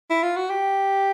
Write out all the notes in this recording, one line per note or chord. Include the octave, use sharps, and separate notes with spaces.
E4
F4
F#4
G4